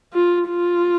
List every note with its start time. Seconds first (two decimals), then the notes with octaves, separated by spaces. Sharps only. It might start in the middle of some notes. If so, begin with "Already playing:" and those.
0.13 F4
0.48 F4